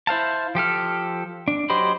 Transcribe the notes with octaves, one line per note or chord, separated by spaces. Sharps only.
E4 C5 F5 A5
F3 G4 A4 F6
D4
F#3 G4 C5 D#5 B5